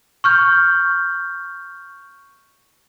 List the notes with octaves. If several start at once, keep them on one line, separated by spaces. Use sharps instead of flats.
C#6 F6 G6